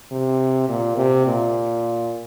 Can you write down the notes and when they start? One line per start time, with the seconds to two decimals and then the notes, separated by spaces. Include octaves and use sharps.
0.12 C3
0.69 A#2
0.97 C3
1.27 A#2